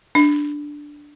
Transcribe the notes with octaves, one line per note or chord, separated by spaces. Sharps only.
D4